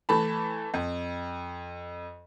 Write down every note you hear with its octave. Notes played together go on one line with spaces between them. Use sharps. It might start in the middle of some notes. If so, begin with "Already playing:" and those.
E3 A3 A5 B5
F2